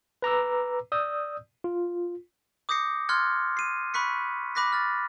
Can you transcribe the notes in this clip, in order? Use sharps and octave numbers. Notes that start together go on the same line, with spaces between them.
B4 A#5 D6 E6
D5 D#6 E6 G6
F4
D6 D#6 G6 A#6 C7 C#7
C6 F6 F#6 G#6 A6 C#7
C7 D#7
B5 C#6 F#6 B6 C#7
B5 D6 F#6 A#6 B6
F6 A6